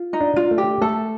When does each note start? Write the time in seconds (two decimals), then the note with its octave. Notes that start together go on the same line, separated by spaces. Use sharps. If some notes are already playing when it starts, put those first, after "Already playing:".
Already playing: F4
0.13 D#4
0.20 D4
0.36 F4
0.51 A3
0.58 G4
0.81 A3 A4